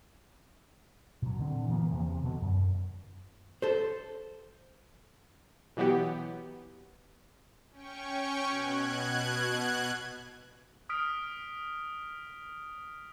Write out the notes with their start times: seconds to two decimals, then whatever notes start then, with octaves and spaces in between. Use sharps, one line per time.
1.22 B2 F#3
1.39 A#2 D3 C4
1.70 E3 A#3 B3
1.91 E2 C3 F3
2.24 B2 D3 F#3
2.42 F#2
3.62 A4 C5
5.77 B2 E3 F#3 B3 G4
7.71 C#4 G5 C#6
8.47 B2 F#6 G#6
10.89 D#6 F6 B6 D7